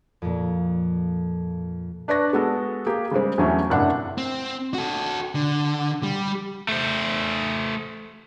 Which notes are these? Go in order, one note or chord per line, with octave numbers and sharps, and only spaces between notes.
F2 A#2
D4 B4 D5 C#6 A#6
G#3 B3 F#4 A4
A#3 G4 G#4
C#3 G3 G#3 C4
E2 E3 F#3 A3 C#4
F#1 A2 C3 D4 F#5
C4
F#4 A4
D3
G3
A3 C5